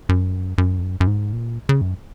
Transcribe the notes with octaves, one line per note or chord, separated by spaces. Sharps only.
F#2
F#2
F2
F#2
F#2
G#2
A#2
C#3
F#2